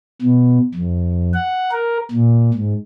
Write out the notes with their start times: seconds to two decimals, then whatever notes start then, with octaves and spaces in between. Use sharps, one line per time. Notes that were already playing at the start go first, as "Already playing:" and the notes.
0.22 B2
0.75 F2
1.34 F#5
1.71 A#4
2.11 A#2
2.54 G#2